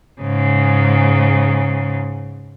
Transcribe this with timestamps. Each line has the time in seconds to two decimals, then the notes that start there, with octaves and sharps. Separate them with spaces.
0.21 G#2 C#3